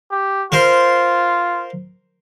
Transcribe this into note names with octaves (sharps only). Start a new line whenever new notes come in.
G4
F4 A#4 C5 C6